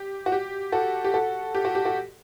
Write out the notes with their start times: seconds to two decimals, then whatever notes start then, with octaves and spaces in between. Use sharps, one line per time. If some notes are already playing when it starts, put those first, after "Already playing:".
Already playing: G4
0.26 F#4
0.32 G4
0.72 F#4 A4
1.05 G4
1.14 F#4 A4
1.55 G4
1.65 F#4
1.75 G4
1.85 F#4 A4